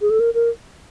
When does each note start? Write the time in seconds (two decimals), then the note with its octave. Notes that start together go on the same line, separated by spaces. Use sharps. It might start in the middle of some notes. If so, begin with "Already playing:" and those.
0.01 G#4
0.10 A4
0.20 A#4
0.34 A#4